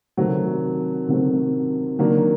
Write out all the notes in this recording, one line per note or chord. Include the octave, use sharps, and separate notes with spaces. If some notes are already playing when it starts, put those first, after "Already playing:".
C3 D#3 F#3 A3 C4
C3 D#3 F#3 A3 C4
D#3 F#3 A#3 D4